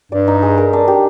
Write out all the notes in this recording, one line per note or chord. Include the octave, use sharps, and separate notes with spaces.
G2 D5
D#4
G#3
A#4
D4
G4